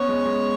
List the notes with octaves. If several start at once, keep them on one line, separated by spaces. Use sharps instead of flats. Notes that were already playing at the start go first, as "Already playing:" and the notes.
Already playing: B3 C#4 C#5
G#3
G#3